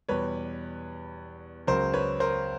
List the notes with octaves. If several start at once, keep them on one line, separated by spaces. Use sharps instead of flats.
E2 B2 G3 B4 C#5
C#2 C#3 F#3 A#4 C5
B4 C#5
A#4 C5